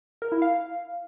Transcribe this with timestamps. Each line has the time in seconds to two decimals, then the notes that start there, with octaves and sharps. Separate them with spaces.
0.22 A#4
0.32 E4
0.42 F5